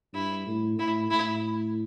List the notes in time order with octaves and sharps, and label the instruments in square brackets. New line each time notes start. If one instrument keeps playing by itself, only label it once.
[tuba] G2 [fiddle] E4
[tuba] A2
[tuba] A2 [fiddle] E4
[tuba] A2 [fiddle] E4